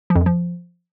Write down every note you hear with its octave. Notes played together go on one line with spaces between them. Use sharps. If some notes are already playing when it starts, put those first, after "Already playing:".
F3
F2
F#2
F3